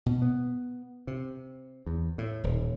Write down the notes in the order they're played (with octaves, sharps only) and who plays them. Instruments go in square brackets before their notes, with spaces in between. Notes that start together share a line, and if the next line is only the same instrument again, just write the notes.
[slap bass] B2
B3
C3
E2
A2
D#1